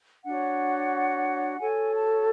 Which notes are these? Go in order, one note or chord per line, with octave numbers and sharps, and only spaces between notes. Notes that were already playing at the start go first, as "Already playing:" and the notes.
D4 F#4 C#5 F#5
F#4 A4 C#5 G#5
A5